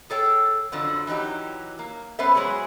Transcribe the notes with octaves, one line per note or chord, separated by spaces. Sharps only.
G#4 A4 C#5 G5
F2 D3 F3 F#3
E3 F#3 D#4 G4
A#3
G3 B3 C#4 B4 C5 E5
F#3 G#3 B3 G#4 C#5